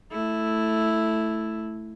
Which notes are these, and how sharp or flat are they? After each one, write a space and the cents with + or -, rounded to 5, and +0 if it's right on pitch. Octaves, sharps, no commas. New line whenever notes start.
A3 +0 E4 +0